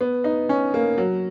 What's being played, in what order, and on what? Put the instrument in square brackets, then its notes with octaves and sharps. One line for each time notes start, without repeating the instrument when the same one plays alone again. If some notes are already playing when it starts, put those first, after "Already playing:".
[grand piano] B3
D#4
C#4
A#3
F#3